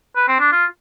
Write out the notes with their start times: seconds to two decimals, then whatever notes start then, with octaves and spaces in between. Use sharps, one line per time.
0.16 B4
0.28 C4
0.40 D4
0.52 F4